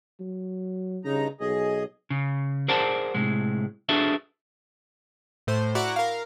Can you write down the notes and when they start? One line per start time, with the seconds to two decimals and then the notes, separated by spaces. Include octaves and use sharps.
0.20 F#3
1.05 G2 C#3 D#4 A#5
1.41 B1 G#4 D#5
2.10 C#3
2.68 G#4 A#4 C5 D5 F#5 A5
3.14 A2 C3 G#3
3.89 D4 F#4 G#4 A4 B4 E5
5.47 A2 C5
5.75 E4 F#4 D5 F#5 A#5 D6
5.96 A#4 F5